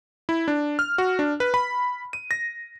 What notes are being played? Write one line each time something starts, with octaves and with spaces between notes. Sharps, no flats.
E4
D4
F6
F#4
D4
B4
B5
D#7
A#6